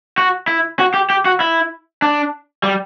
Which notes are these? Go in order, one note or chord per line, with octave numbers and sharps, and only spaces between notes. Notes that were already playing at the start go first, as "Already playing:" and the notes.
F#4
E4
F#4
G4
G4
F#4
E4
D4
G3